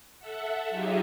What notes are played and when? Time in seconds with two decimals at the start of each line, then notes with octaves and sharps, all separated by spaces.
0.19 A4 E5 F#5
0.70 F#3 D#4 F4 G4 G#4 E5